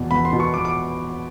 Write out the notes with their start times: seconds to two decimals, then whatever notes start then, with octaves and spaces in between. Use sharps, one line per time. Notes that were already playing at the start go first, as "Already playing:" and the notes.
Already playing: E2 B2
0.11 E2 B5
0.25 C6
0.33 B2
0.40 C#6
0.54 E2 D6
0.65 D6